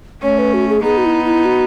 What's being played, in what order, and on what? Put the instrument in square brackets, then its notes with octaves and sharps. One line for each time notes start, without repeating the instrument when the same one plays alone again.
[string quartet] A3 C#4 [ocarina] C#5
[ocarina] B4
F#4
G#4
[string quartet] B3 D#4 [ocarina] G#4
[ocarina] F#4
E4
E4
F#4